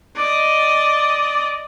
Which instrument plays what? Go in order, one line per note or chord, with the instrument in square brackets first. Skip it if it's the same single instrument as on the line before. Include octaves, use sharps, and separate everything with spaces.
[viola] D5 D#5